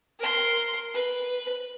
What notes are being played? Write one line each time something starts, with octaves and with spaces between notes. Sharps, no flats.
A#4 C6
B4